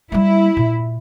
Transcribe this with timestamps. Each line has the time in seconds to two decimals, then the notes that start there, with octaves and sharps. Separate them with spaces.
0.12 G3 A#3 E4
0.57 A#2